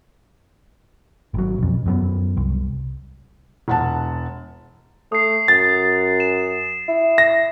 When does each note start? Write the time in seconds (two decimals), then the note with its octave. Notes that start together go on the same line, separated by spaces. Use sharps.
1.34 G#1 F#3
1.58 B1 F2
1.86 F#2 F#3 B3
2.37 C2
3.68 E1 F#5 A5
5.12 A3 D#6 C7
5.48 F#2 A6
6.20 E7
6.88 E4
7.18 A#6